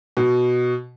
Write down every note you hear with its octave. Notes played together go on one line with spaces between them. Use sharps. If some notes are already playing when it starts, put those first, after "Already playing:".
B2